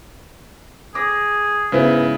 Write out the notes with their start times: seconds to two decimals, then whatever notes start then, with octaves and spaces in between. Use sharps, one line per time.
0.95 G#4 D6 A#6
1.72 G#2 C#3 B3 E4 B4